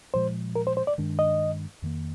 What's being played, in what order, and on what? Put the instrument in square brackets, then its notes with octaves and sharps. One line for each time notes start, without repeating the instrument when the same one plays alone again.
[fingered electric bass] A#2 F3 G#3 [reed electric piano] C5
[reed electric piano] A#4
C5
C5
D5
[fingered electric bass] G2 D#3 G#3 D4
[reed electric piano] D#5
[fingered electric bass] F2 D#3 A#3